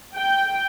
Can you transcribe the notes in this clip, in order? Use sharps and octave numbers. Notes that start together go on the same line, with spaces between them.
G5